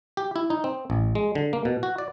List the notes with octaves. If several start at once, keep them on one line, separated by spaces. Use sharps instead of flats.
G4
E4
D#4
C4
A1
G#3
D3
A#3
B2
F#4
D5